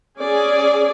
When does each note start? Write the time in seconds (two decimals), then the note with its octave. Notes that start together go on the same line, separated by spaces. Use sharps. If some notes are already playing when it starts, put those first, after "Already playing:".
0.21 C#4 G#4 D5